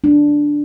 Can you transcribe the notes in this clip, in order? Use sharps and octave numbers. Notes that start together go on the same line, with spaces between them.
A3 D4
A3